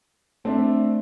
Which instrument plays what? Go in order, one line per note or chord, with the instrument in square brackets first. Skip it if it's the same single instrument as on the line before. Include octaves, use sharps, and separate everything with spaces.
[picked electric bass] A3 [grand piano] C4 D4 E5